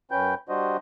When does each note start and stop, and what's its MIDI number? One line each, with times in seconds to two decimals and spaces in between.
0.11 0.34 42
0.11 0.34 61
0.11 0.34 71
0.11 0.34 79
0.11 0.34 91
0.49 0.77 55
0.49 0.77 62
0.49 0.77 66
0.49 0.77 72
0.49 0.77 75